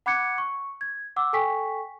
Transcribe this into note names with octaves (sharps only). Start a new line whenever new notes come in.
F#5 B5 D6 F#6 G#6 C#7
C#6
G#6
F#5 D6 E6
A4 G5 G#5 C#6 B6